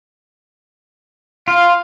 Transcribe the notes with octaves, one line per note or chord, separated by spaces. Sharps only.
F4 F5